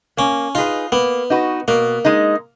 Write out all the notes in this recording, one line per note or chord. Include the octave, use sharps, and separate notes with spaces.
A#3 C#4
D#4 F4 G#4 B4
A#3 B3
D#4 F#4 B4
B2 A#3
G#3 D#4